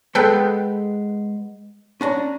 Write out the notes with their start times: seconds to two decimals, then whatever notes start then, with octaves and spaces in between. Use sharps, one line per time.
0.15 G#3 B3 A4 B4 G5
2.01 C#4 D4 A#5